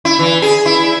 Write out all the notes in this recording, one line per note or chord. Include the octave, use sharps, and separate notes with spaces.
E4
E3
G#4
E4